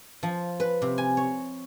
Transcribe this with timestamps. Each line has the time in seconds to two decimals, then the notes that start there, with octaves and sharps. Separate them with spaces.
0.23 F3
0.60 B4
0.82 C3
0.98 G#5
1.17 C#5